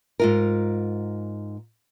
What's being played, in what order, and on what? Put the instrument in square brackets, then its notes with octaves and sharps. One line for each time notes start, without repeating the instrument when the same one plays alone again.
[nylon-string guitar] G#2 F4 A#4